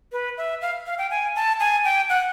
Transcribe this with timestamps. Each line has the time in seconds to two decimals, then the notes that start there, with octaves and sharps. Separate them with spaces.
0.12 B4
0.37 E5
0.62 F5
0.86 F5
0.98 G5
1.11 G#5
1.36 A5
1.60 G#5
1.85 G5
2.09 F#5